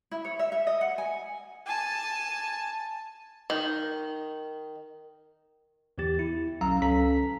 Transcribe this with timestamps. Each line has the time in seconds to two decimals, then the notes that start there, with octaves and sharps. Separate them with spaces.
0.11 E4
0.25 C#5
0.39 E5
0.52 E5
0.67 D#5
0.81 F#5
0.98 G#5
1.66 G#5 A5
3.50 D#3
5.98 E2 E3 B3 G4 A6
6.19 E4
6.61 B1 F#3 C#4 F5 A#5 E6
6.82 C#2 C#4 A4 A#5 B6